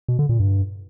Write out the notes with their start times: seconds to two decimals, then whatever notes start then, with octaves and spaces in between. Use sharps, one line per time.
0.08 B2
0.19 D3
0.29 A#2
0.40 G2